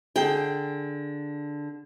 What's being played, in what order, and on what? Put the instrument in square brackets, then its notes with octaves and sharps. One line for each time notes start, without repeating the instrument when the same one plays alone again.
[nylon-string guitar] D3 G#4 G5